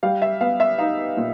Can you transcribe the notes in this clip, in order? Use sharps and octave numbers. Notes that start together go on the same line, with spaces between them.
G3 F5
E5
B3 F5
E5
D#4 F5
A#2